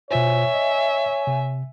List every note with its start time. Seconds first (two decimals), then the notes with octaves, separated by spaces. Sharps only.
0.11 B2 F4 C5 C#5 E5 G#5
0.54 D#5
1.27 C3